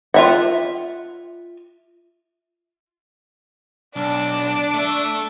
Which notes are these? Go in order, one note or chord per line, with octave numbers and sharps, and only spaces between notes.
F4 E5 F#5
B1 D4 D6
A3 E5